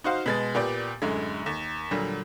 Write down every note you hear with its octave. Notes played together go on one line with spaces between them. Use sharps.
D#4 F#4 C5 F5
B2 G#3 A6
A#2 B3 G4 D5 D6
F#2 A2 D3 G#3
D#2
A#2 D3 F#3 G3